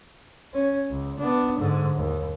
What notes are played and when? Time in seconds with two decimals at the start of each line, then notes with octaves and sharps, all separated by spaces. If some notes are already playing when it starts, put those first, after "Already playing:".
0.54 C#4
0.91 C#2
1.19 B3 D4
1.58 G#2 D3
1.96 D#2